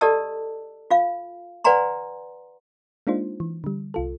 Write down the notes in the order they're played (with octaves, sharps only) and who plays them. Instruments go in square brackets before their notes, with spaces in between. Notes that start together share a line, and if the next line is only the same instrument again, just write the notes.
[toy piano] G4 A4 D5 D#5 A5 E6
F4 F5
B4 D5 F#5 G#5 A#5 C6
[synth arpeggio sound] G#3 A#3 D4 D#4 F4 C5
E3
D3 G3
C2 F4 A4